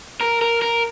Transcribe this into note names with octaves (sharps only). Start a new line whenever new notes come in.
A#4
A#4
A#4